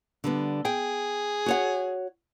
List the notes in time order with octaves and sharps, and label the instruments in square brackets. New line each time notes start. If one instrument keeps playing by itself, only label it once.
[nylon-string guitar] D3 G3 B3
[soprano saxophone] G#4 [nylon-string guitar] G5
[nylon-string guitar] F#4 C#5 F#5